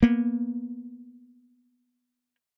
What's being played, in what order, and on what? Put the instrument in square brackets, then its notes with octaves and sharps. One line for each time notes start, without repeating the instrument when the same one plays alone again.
[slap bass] A#3 B3